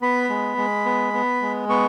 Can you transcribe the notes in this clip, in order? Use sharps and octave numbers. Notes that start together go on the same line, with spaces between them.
B3 B5
G#3
G#3
B3
B3
G#3
B3 C#6